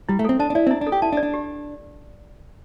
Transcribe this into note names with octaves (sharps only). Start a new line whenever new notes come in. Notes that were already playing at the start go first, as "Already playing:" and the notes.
G3 E4
A3
C4 A4
D4 A5
D4
E4 D5
C4
D4 E4
D4
A4
G4
E4 A5
D4
D5
D4
G4